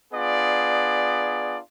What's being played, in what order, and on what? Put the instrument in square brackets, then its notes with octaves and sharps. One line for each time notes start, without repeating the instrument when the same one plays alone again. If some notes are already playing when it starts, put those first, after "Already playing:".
[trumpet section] B3 D4 F4 G#4 D5